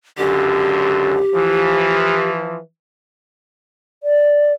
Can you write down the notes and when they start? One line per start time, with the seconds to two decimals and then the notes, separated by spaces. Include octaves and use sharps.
0.18 C#2 F#2 D3 G4
1.33 E3 F3
4.03 D5